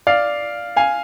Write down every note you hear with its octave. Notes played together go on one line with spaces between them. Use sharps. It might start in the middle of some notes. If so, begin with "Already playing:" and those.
D5 F5
F5 G#5